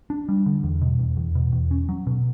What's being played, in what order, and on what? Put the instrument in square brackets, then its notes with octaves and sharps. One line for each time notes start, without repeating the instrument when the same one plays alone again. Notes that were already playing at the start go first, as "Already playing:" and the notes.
[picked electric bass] D4
G3
D3
E2
B2
E2
E2
B2
E2
C#4
F#3
B2